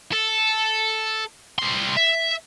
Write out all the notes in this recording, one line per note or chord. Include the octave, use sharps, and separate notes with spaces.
A4
G3 C6
E5